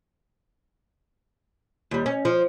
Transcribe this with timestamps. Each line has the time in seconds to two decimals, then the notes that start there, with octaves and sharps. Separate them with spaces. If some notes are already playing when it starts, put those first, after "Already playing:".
1.91 D#2 G3
2.06 C#4
2.25 F3